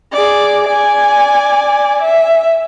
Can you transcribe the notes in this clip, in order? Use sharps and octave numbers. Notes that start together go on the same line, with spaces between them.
G#4 D5
D5 G#5
E5